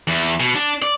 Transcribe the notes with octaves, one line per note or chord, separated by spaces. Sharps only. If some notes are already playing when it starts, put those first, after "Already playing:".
E2
B2
D4
D5